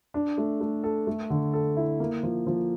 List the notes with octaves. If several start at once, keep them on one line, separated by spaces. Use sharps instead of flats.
D4
A3
A3
A4
A3
D3
A4
E4
A#3
F3
F3